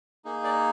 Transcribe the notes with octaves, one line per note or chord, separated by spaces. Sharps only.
A#3 D#4 G#4
D5